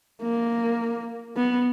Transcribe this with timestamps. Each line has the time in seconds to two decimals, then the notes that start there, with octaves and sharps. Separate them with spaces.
0.22 A#3
1.36 B3